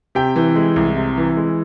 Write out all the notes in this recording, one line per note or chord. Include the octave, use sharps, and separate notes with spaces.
C3 G4 G5
E3
G#3
C2
C3
E3
G#3